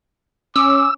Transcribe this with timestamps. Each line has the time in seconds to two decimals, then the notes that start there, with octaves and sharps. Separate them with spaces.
0.56 C#4 D6 E6